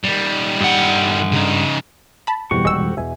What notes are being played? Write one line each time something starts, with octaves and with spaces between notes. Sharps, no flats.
D#3 G3
G2 F#5
C#3 D#4
A5 B5
F2 G#2 B2 E3 G3 F#4 G4 C#6
D#1 G#3 E6
F2
E2 B2 E5 G#5